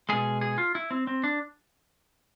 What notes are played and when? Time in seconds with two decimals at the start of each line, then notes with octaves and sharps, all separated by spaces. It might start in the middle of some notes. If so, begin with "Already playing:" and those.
0.09 B2 G#3 G#4
0.41 G#4
0.58 F4
0.75 E4
0.91 C4
1.07 C4
1.24 D4